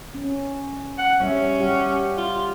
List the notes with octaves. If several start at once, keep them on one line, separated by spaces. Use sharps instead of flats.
C#4
F#5
G3 C#4 C#5 E5
G3 G4 F#5
F4